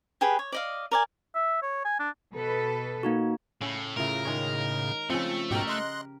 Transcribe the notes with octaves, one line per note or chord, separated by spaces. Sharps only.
G4 G#4 B4
C#5
D5 D#5 F5
A#4 D5 G#5
E5
C#5
G#5
D4
B2 A4 B4
A#3 D#4 F#4
A2 C#3
A2 C#3 A3 F4 A#4
D#3 G#3 C#5
C#3 F3 A3 C4
G#2 B2 G4 A#4 G5
D#5 C6 F#6